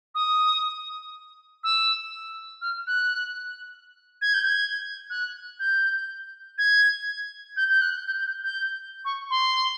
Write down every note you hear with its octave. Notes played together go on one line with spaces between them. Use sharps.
D#6
E6
F6
F#6
G#6
G6
G#6
F#6
G6
G#6
G6
G6
F#6
G6
G6
G6
C#6
C6